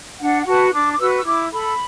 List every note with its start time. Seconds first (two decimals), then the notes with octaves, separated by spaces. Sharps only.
0.20 D4 F#5
0.40 F#5
0.47 F#4 B4 A5
0.73 D4 D6
0.92 D6
1.00 F#4 B4 E6
1.09 F#6
1.18 E6
1.25 E4 D6
1.51 A4 B5